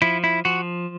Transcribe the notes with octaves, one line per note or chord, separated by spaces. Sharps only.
F3 E4
E4
F3 F#4